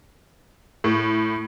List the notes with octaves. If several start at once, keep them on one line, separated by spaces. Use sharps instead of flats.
A2